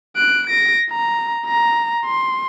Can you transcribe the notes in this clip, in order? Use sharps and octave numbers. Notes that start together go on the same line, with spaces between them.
F#6 D7
A#6 D7
A#5
A#5
C6